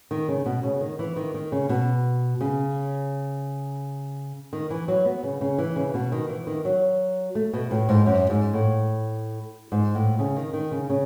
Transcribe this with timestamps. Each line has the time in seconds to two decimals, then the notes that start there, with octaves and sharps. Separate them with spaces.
0.11 D#3
0.28 C#3
0.46 B2
0.63 C#3
0.81 D#3
0.99 E3
1.16 D#3
1.34 D#3
1.52 C#3
1.69 B2
2.41 C#3
4.53 D#3
4.70 E3
4.88 F#3
5.05 B3
5.23 C#3
5.41 C#3
5.58 E3
5.76 C#3
5.94 B2
6.12 D#3
6.29 E3
6.47 D#3
6.65 F#3
7.35 A3
7.53 B2
7.71 A2
7.89 G#2
8.06 F#2
8.30 G#2
8.53 A2
9.72 G#2
9.95 A2
10.19 C#3
10.36 D#3
10.53 D#3
10.71 C#3
10.90 C#3